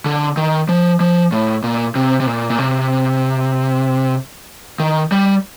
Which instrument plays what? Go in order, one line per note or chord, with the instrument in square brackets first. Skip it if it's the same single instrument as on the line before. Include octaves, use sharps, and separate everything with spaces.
[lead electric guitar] D3
D#3
F3
F3
A2
A#2
C3
C3
A#2
A#2
C3
D#3
G3